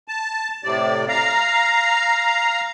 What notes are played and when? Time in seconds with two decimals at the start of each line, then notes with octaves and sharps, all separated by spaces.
0.08 A5
0.64 A2 C3 D5
1.08 F5 A#5